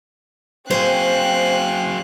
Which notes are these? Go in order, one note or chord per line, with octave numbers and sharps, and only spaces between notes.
F#3 C4 G#4 C5 F5 G5 F#6